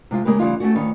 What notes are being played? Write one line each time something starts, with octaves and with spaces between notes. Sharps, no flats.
C3 G#3 F4
C#3 G#3 A#3 G4 B4
C#3 E3 G3 A3 D#4 F4
A3 C4 C#4 F#4
D2 D#3 F4 B4 C#5